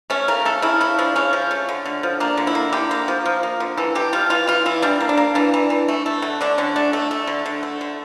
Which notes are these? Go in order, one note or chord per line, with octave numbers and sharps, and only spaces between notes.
A3 C#4
C#3 A#4
A3 A4
C#3 E4
C#3 E4
F3 D4
C#3 C#4
F3
A3
D3
D3
F3
A#3 D4
D3
E4
A#3
D3 G4
A#3
F3
F3
A#3
D3
E3 A4
E3 G4
G3 F4
E3 F4
E3 F4
E3 E4
G3 D4
A#3
D4
A#3
E3 D4
E3
E3
A3
A3
D3
D3 D4
D3 C#4
A3 D4
A3
A3
D3
D3
A3
D3